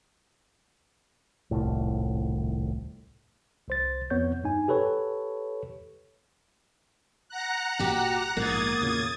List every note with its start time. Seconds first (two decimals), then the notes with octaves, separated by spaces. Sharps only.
1.51 D#1 C2 A2
3.68 C2 C5 A6
4.10 F2 B3 C#5 G6
4.44 G2 D#4 G#5
4.68 G4 A4 B4 C#5
7.29 F#5 A#5 F#6
7.79 G1 A#2 F#4 G4
8.37 A#1 G#2 A#3 D#6 G#6 A6
8.82 E2 A#2 C#3